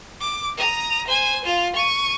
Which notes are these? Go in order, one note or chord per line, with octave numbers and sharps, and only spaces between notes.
D6
A#5 D#6
C5 G#5
F4
C#6 D#7